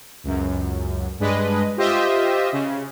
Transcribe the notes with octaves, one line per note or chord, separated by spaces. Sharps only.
C#2 F#2
G2 G#3 D4 B4 D#5
F4 G4 C5 D#5 E5
C#3